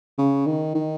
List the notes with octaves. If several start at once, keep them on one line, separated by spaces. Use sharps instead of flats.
C#3
D#3
D#3